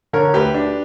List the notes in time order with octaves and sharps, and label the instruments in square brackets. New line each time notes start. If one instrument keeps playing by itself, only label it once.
[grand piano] D3 A#4 C#5
D2 G4 B4
D4